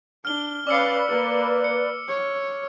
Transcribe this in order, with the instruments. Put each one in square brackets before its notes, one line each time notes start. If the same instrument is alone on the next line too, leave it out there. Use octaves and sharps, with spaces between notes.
[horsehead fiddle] D4 [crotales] F6 G7
[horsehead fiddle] C#4 F5 [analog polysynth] B4 D5 [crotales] D6 E6 C#7
[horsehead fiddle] A#3
[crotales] C#7
[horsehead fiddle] C#5